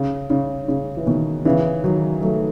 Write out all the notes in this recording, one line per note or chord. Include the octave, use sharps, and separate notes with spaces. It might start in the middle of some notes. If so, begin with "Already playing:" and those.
Already playing: C#3
C#3
C#3
E3
B2 D#3
C#3 E3
D#3 F#3
F#3 A3